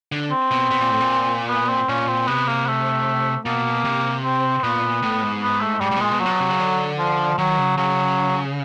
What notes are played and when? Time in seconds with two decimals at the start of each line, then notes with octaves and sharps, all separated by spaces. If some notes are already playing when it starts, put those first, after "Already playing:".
0.12 D3
0.32 C4
0.51 B2
0.71 B2
0.80 A#2
0.91 A2
1.00 A#2
1.49 B3
1.69 C4
1.89 A#2 C#4
2.08 C4
2.28 C3 B3
2.48 A#3
2.67 A3
3.45 B2 A#3
3.85 C3
4.25 C4
4.64 A#2 B3
5.03 A2
5.22 G#2
5.43 B3
5.61 A3
5.81 G#2 G3
5.91 G#2
5.96 B2
6.01 A#2 G#3
6.11 B2
6.20 A#2 F#3
6.26 C3
6.30 B2
6.41 C3
6.50 C#3
6.60 D3
6.99 F3
7.38 D#3 F#3
7.58 C#3
7.77 C#3 F#3